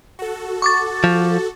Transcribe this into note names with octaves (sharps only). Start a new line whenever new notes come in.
F#4 A4
C#6 D6 A6
F3